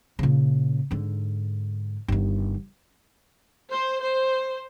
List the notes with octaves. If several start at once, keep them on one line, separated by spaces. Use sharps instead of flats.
A#2 C#3
G#2 D3
G1 D#3
C5
C5